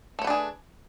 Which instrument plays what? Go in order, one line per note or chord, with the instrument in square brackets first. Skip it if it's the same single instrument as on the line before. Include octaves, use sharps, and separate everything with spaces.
[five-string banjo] A3
C#5
B4
D4
G#4